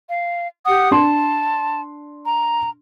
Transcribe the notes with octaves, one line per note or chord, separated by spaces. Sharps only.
F5
G4 F#5 D#6
D4 A5 C6
A#5